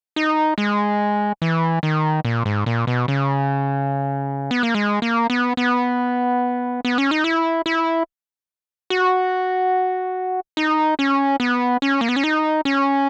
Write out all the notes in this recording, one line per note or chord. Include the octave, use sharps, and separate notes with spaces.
D#4
G#3
E3
D#3
A#2
G#2
A#2
B2
C#3
B3
A#3
G#3
A#3
B3
B3
B3
C#4
D#4
E4
E4
F#4
D#4
C#4
B3
C#4
A#3
B3
C#4
D#4
C#4